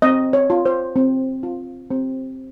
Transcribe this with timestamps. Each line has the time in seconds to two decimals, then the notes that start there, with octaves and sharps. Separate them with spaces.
0.02 C4 D#5
0.33 C#5
0.50 F4
0.66 C5
0.96 C4
1.43 F4
1.91 C4